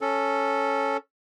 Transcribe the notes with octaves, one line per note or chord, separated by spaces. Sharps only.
C#4 A4